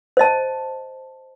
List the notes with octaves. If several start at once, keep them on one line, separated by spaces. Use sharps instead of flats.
C5 D#5 A5